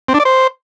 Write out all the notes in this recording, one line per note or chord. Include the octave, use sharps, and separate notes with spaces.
C4
D4
D5
C5